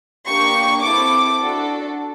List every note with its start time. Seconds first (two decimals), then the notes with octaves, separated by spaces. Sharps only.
0.26 A#3 D4 G4 C#6
0.82 C4 E4 A4 D6
1.39 D4 F#4 A4